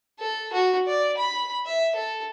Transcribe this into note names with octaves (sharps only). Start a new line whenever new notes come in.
A4
F#4
D5
B5
E5
A4